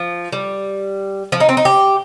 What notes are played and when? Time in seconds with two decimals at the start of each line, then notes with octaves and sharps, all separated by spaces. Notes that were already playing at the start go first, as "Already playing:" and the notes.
Already playing: F3
0.32 G3
1.32 F3
1.40 D#4
1.49 C4
1.57 D#4
1.65 G4